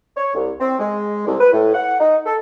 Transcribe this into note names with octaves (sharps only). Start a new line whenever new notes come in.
C#5
C2
C4
G#3
C2
B4
A2
F#5
D#4
A4